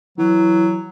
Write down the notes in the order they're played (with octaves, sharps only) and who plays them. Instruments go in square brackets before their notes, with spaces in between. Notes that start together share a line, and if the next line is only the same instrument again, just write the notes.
[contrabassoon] E3 [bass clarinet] F#3